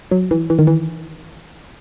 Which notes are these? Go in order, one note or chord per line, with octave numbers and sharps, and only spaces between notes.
F#3
E3
E3
D#3
E3